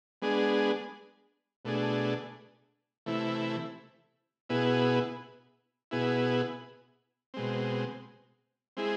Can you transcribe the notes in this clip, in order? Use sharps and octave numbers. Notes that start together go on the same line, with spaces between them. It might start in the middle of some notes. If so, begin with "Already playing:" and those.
G#3 B3 D4 G#4
B2 A3 D4 G#4
C3 E3 A3 E4
B2 B3 E4 G#4
B2 B3 E4 G#4
B2 G#3 C4
G#3 C4 E4 G#4